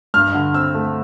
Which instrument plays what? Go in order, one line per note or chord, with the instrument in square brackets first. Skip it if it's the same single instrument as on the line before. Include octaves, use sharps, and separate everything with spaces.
[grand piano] G2 F6
D3
C4 E6
A3